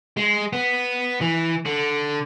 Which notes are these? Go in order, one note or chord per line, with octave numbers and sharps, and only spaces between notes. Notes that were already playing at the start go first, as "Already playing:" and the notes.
G#3
B3
E3
D3